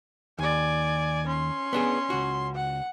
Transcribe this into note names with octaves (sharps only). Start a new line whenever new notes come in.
D#2 D5 G#5
C#4 C6
B3 D4 G#4
C#2 F#4
F#5